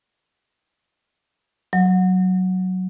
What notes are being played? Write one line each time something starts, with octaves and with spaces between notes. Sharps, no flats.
F#3